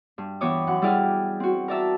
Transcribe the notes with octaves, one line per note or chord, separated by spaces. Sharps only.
G2
E3 B3 G4 C#5 D6 D#6
F#2 F#5
G3 E4 G4 G#4 D5 F6
C4 F#4
A#4 D5 E5 A5